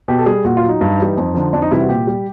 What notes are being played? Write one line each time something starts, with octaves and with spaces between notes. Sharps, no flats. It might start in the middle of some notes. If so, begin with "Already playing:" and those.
B2 G4
A4
G3 G#4
A#2 F#4
F4
F#3
D#4
G2
E3 G3
F2
D3 F3
F2 D4
D#4
C3 E3 G3 E4
F#4
A#2 G4
G3